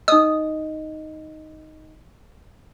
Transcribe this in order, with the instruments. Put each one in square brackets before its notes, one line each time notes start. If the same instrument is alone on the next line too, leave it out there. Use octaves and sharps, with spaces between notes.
[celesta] D#4 D#5 [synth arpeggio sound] D#6